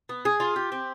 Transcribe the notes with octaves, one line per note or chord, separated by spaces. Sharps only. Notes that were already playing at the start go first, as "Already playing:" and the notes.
B3
G#4
F4
G4
C4